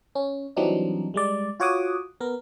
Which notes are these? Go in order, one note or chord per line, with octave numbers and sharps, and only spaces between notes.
C#4
E3 F#3 G3 C4 D4 D#4
G3 G#3 D5
F4 F#4 C#5 F#5 D6 D#6
B3 A#4